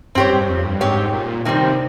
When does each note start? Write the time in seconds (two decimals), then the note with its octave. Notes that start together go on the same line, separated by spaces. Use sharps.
0.15 G2 C4 G4 C#5
0.32 G2
0.48 F2
0.65 G2
0.80 G#2 C4 G4 C#5
1.13 A#2
1.45 C3 D#3 G3 C4